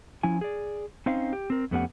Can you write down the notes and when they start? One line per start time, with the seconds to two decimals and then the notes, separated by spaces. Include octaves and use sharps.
0.23 F3 C#4 E4 G#5
0.41 G#4 D5
1.06 C4 C#4 D#4 C5 F5
1.33 G4
1.50 C4 A#4
1.71 F2 A3 B3 C#4 G4 F#5